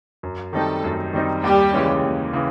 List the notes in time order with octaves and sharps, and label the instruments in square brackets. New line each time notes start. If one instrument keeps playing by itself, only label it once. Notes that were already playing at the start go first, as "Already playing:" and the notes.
[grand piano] F#2
[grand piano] D#3 G3 C4 D#4 [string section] A3 A4
[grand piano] F#2
D#3 G3 C4 D#4
[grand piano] D#2 [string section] G3 G4
[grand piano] C#3 E3 G#3 C#4
D#2
C#3 E3